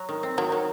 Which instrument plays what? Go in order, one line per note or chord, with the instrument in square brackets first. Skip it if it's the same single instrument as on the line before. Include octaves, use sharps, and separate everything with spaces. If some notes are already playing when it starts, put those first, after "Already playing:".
Already playing: [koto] F#3
D#3
C4
[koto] D#3 [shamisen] F#3
[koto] D#3